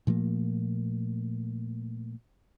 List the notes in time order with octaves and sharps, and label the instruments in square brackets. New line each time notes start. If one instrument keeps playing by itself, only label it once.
[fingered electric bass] A#2 F3 A3 A#3